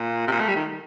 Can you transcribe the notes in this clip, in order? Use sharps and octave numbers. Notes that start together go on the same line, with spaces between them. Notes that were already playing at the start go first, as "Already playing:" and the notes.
Already playing: A#2
C3
A#2
A3
G3
D#3